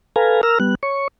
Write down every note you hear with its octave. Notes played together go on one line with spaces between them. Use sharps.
A4 B4 F5 G#5 A#5
A#4 A#5 E6 F6
G3 B3 F#6
C#5 C#6